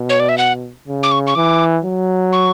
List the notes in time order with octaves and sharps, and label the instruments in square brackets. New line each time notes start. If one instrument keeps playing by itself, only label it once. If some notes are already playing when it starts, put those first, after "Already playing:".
Already playing: [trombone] B2
[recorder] C#5
D5
E5
F#5
[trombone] C#3
[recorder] D6
C#6
C#6
[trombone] E3 [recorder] D6
[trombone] F#3
[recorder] C#6